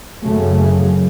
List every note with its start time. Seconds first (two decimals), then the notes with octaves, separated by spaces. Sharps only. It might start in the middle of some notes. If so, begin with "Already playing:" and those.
0.23 F#2 C#3 A3